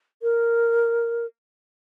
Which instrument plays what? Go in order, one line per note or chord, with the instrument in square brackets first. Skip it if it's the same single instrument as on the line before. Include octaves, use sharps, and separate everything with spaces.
[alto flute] A#4